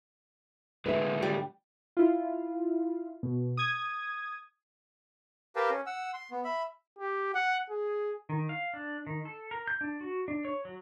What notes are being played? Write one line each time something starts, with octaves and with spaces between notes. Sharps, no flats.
A2 D3 G#3 B4 E5
G3
E4 F4
B2
D#6 G#6
G4 A#4 B4 F5 G5 A5
C#4
F#5 E6
C6
B3
E5 B5
G4
F#5
G#4
D#3
F5
D4
D#3
A4
A#4
G6
D4
F#4
D4
C#5
F#3